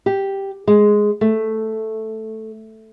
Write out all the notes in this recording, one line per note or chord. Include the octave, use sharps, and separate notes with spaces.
G4
G#3
A3